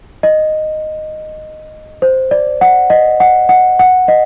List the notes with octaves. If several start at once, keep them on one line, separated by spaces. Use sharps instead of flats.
D#5
C5
D5
F#5
D#5
F#5
F#5
F#5
D#5